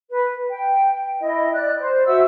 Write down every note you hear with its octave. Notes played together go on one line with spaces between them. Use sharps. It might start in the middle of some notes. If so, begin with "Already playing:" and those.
B4
G5
E4 D#5
D5 F#6
C5
F#4 E5 F#5 E6